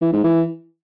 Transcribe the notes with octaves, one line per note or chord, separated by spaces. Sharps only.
E3
G#2
E3